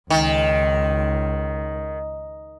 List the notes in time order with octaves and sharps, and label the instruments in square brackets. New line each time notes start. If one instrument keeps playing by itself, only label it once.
[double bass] C#2 [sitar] D#3